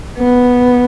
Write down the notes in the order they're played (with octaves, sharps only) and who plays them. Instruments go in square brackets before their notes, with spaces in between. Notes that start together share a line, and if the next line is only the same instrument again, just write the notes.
[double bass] B3